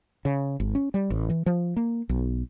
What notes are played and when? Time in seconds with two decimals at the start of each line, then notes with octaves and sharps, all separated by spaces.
0.25 C#3
0.60 G#1
0.75 C#4
0.94 G3
1.10 A1
1.30 E3
1.46 F3
1.76 A#3
2.09 B1